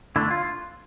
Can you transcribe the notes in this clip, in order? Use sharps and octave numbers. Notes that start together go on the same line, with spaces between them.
D3 A3 D4 E4
F4